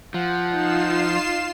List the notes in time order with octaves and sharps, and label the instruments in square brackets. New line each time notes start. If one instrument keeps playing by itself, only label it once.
[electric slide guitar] F3 [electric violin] F#5
[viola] D#4 [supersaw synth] F4 C7 E7